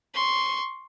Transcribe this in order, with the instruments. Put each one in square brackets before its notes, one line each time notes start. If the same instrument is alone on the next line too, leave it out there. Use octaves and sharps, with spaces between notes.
[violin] C6 C#6